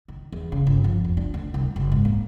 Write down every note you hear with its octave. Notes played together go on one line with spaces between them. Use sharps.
D#3
E2
C#3
G1
F3
F2
D4
D2
C2
F#1
G#2
A#3